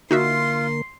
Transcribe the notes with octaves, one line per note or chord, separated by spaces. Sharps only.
D3 A#3 D#4 F4 F#4 A#4 E5 C6